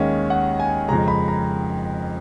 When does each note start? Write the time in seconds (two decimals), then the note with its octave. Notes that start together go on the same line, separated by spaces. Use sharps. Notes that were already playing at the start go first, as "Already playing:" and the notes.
Already playing: D#2 D#3 G#3 C#4 F5
0.30 F#5
0.60 G#5
0.88 F2 C#3 G#3 A#5
1.08 B5
1.28 A#5